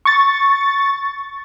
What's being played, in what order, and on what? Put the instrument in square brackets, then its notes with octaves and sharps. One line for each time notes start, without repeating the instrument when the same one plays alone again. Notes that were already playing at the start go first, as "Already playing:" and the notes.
[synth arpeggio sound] C#6 A6